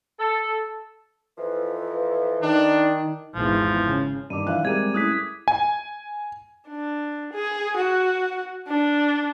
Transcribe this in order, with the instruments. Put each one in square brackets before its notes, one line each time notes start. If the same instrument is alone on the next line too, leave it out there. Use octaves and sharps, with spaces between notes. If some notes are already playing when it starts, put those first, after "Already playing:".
[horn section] A4
[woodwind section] F2 E3 F3 [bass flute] B4
[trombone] D#3 [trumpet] D4 [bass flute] D#4
[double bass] G#1 E2 [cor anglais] F3
[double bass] C#3
[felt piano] G2 D#3 [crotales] D6 D#7
[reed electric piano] E3 F3 D4 [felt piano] E5 F5 F#6
[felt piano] G3 G#3 A#4 [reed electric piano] C4 [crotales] G#6 D#7
[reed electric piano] A3 C#4 E4 [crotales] D#6 F#6 B6
[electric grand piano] G#5
[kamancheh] D4
G#4
F#4
D4